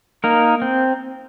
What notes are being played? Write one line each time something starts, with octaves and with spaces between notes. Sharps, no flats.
A#3 D#4 A#4
C4